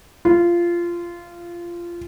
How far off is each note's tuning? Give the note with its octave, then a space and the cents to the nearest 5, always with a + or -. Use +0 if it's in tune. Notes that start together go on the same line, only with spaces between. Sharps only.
F4 -15